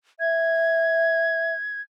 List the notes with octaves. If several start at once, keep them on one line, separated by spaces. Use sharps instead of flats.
E5 G#6